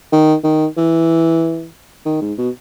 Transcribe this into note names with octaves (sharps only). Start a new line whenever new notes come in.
D#3
D#3
E3
D#3
G#2
B2